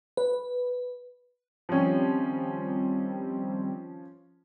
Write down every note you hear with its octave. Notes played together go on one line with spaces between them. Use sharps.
B4
D#3 F3 G3 C4 C#4